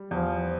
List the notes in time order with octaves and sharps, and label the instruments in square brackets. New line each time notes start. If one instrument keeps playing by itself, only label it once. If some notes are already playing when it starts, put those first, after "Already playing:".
Already playing: [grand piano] G3
[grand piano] E2 [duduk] F3